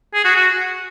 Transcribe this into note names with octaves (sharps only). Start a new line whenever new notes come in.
G#4
F#4
F#4